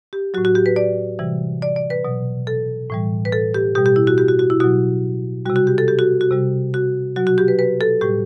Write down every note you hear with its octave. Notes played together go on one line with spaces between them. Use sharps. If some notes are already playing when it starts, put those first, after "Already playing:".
G4
A2 F#3 F#4
F#4
G4
B4
D5
C3 E3 G3
D5
D5
B4
B2 F#3
A4
A2 E3 G3
B4
A4
G4
B2 G3 G4
G4
E4
F#4
G4
F#4
F#4
E4
B2 F#3 F#4
C3 G3 F#4
F#4
G4
A4
G4
F#4
F#4
C3 G3
F#4
B2 F#3 F#4
F#4
G4
B4
B4
A4
A2 G3 G4